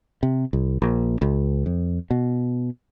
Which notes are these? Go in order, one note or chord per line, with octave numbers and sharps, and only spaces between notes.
C3
C2
A#1
C#2
F2
B2